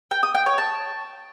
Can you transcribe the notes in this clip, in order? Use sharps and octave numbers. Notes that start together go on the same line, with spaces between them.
G5
D#6
G5
C#5
A5